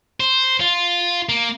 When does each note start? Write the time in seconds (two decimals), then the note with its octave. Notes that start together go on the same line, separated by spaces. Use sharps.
0.20 C5
0.61 F4
1.29 A#3